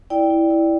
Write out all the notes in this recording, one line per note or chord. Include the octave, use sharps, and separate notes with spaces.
E4 D5 G5
E4
E4